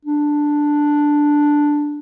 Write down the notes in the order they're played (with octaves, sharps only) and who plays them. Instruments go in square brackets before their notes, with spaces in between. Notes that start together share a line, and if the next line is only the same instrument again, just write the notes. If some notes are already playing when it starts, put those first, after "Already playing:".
[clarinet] D4